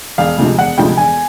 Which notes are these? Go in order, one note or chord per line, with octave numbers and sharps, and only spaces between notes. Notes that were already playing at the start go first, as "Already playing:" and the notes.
E1 F5
D2 C3 F3 G#3
E1 F#5
D2 C3 F3 G#3 G5
E1 G#5